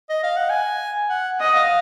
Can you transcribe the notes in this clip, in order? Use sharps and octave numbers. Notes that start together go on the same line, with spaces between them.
D#5
F5
F#5
G#5
F#5
D#5 F#5
F5